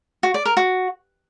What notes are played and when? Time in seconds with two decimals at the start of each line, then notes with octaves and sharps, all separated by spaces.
0.23 F#4
0.34 D5
0.45 A#4
0.57 F#4